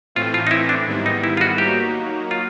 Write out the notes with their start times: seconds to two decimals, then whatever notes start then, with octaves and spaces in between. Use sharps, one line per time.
0.15 A2 E3 A3 C4 F4
0.34 F4
0.47 D#4
0.51 E4
0.69 D4
0.87 G#2 D#3 G3 B3 E4
1.06 D#4
1.24 E4
1.37 F4
1.41 F#4
1.58 F#3 A#3 D#4 F#4 G4
2.31 F4